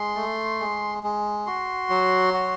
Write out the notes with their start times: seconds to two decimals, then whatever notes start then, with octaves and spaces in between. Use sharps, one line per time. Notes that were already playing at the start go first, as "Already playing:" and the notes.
Already playing: G#3 C6
0.16 A3
0.60 G#3
1.03 G#3
1.47 F#4 C6
1.90 F#3
2.34 F#4